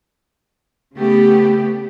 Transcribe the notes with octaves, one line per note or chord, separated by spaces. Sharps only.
C#3 A3 B3 G4